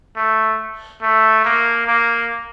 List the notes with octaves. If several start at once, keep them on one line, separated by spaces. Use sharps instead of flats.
A3
A3
A#3
A#3